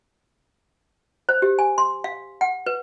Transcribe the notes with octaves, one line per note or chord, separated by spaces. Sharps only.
C5
G4
G#5
C6
F5
F#5
B4